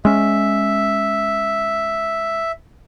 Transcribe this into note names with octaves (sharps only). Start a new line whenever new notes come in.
G#3 C#4 E5